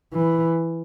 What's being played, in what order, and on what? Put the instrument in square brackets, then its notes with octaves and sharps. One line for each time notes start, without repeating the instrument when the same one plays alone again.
[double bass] E3